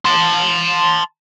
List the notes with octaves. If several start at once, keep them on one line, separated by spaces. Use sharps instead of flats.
A5 C6